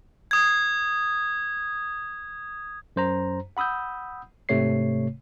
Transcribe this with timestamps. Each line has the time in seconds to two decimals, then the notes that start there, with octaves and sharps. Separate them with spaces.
0.31 D#6 G#6
2.96 F#2 C5 A#5
3.57 F#5 B5 D#6 E6 G6
4.49 A1 G#2 C3 A3 C#5 C7